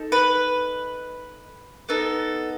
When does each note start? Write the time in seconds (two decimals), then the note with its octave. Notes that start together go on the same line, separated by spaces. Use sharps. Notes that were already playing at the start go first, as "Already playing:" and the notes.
Already playing: D#4 A4
0.12 B4
1.89 B3 D#4 A4